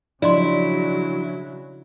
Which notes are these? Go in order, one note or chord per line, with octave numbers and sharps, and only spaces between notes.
C#3 F3 F#3 D4 E4 D5 D#5 C6